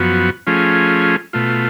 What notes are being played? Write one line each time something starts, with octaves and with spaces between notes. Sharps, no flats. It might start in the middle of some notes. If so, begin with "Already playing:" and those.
Already playing: F#2 F3 B3 F#4
F3 A3 C#4 F4 G#4
B2 A3 F4